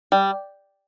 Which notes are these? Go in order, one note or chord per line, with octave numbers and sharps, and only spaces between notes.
G3